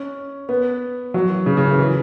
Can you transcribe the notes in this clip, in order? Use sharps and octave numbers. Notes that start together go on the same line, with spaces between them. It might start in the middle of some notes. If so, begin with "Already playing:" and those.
Already playing: C#4
B3
F#3
E3
C#3
C#3
E3
E3